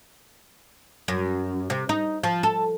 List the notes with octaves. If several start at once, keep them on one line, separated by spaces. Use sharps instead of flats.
F#2
C3
D#4
F3
A4